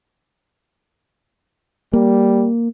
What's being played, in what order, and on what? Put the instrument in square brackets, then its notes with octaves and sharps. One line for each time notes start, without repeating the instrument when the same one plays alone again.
[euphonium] G3 [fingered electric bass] A#3